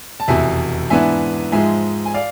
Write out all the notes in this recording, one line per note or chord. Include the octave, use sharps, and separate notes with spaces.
A5
F1 E2 B2 E5 G#5
G#2 E3 B3 D4 E5 G#5
G#2 F3 G#3 E5 G#5
G#5
D5 F5